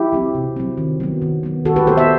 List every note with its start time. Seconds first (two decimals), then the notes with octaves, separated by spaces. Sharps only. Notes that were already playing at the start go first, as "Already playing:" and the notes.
Already playing: E4 G4
0.13 F#3 C4
0.35 C3
0.56 F#3 C4
0.78 D#3
1.00 F#3 B3
1.22 D#3
1.43 F#3 B3
1.65 D#3 F#4 A4
1.76 G4 B4
1.87 F#3 B3 A4 C5
1.97 C5 E5